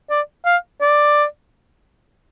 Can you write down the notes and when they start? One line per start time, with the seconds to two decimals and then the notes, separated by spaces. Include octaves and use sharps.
0.10 D5
0.46 F5
0.81 D5